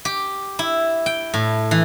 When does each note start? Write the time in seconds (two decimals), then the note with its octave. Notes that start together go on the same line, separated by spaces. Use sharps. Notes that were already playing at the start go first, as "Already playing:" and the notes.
0.05 G4
0.59 E4
1.06 G5
1.34 A2
1.71 E3